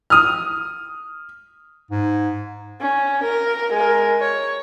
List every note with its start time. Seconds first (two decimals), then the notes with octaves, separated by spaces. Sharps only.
0.10 D#6 F6
1.90 G#2
2.81 C#4
3.24 A#4
3.74 G#3 A#4
4.20 C#5